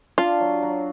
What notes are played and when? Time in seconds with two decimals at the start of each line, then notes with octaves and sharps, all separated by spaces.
0.18 D4 F4
0.40 F#3
0.62 F#3